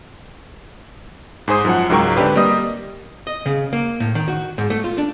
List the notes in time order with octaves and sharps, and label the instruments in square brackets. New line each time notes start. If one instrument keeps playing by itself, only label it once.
[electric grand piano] G#2 G#4 C5 D#6
F#2 F3 F#5
C#2 G#2 F#3 A#4 G5 C#6
D3 C4 D4 G4 B4
G3 A#3 D#5 D#6
[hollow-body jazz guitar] D#5
C#3
A#3
A2
D#3
F#4
G#2
A3
F4
D4